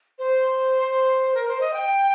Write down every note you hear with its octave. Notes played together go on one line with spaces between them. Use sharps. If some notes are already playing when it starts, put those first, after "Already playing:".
C5
A#4
C5
D#5
G5